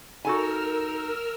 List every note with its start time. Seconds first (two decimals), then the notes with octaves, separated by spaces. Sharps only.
0.25 D#4 F#4 A4 A#4 G#5 E6 F6